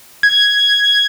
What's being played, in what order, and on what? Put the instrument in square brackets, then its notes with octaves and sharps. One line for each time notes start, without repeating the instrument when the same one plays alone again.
[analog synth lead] G#6